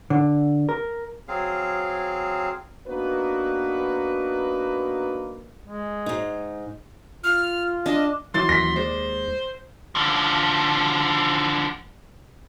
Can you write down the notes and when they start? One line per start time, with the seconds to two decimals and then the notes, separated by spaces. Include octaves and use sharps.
0.10 D3
0.69 A#4
1.28 F#3 C4 G#4 F5
2.86 A#3 B3 D4 D#4 F#4 B4
5.66 G#3
6.06 G#2 D#4
7.24 F4 F6
7.86 D4 D#5
8.34 F#2 E3 E4 C6 A6
8.49 D#2 A#6 B6
8.76 G#3 C5 D5
9.95 D3 F3